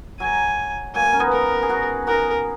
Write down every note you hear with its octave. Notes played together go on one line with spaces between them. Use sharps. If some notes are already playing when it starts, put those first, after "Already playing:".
F#3 G#5
F#3 A#3 G#5
C#4
B3 D#4
A#4
G#4
D#4 F#4
D#4 F#4 A#4